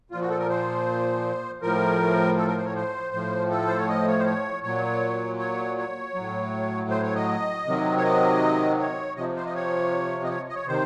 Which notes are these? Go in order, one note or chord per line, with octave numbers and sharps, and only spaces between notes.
A#2 F3 F4
F#4
A4
A#4
C5
A2 F3 A#4
A4
A#4
C5
C#5
C5
A2 F3
A4
C5
C#5
D#5
C#5
C5
C#5
A#2 F#3 C#5
C#5
C#5
F#3
A2
C5
C#5
D#5
C3 D#3 F#3
C#5
D#5
C#5
C3 F3 D#5
C5
D#5
C#5
D#5
C#5
D#5
C#5
C3 D#3 C5